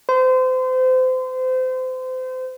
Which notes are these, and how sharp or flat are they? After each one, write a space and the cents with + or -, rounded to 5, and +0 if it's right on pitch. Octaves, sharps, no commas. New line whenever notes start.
C5 -30